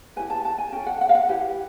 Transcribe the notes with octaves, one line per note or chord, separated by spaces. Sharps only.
E4 G4 B4 G#5
A5
A5
G#5
C#4 F4 A4 G5
F#5
F#5
F5
F#5
E4 G4 B4